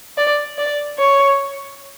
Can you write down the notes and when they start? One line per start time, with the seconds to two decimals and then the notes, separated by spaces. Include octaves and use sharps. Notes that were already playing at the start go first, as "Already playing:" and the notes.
0.18 D5
0.58 D5
0.99 C#5